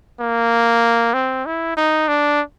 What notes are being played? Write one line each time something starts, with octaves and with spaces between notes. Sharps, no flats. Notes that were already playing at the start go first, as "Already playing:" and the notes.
A#3
C4
E4
D#4
D4